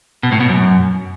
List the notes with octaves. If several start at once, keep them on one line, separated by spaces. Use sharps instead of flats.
B2
A2
B2
F#2